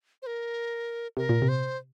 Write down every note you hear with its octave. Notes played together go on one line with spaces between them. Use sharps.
C5
A#4
C3 A#4
A#2
C3
C5